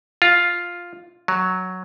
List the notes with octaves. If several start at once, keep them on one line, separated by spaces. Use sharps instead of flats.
F4
F#3